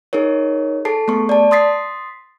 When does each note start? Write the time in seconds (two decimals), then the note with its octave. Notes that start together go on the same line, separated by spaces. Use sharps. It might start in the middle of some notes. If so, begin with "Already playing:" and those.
0.13 D#4 G#4 A#4 C#5
0.85 G#4 A4 A5 C7
1.08 A3 B3 C#6
1.29 D5 A5
1.51 C6 D#6 A6 B6 C7